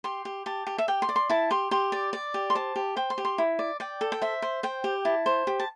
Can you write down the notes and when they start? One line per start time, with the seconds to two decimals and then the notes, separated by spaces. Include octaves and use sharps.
0.04 G4 C6
0.25 G4
0.46 G4 A5
0.67 G4
0.78 E5
0.88 G4 G5
1.02 C6
1.09 D5
1.16 C6
1.30 E4 A5
1.51 G4 C6
1.71 G4 C6
1.92 D5
2.13 D5
2.34 G4
2.50 C6
2.55 C5 A5
2.76 G4
2.96 C5 G5
3.10 C6
3.18 G4
3.25 C6
3.38 E4
3.59 D5
3.80 D5 G5
4.01 A4
4.12 G5
4.22 C5 E5
4.42 C5
4.63 C5 G5
4.84 G4
5.05 E4 A5
5.26 C5
5.47 G4
5.60 A5